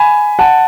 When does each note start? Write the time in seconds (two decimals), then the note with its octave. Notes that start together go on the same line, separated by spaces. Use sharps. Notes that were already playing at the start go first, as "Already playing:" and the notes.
Already playing: G#5 B5
0.39 F#5 A5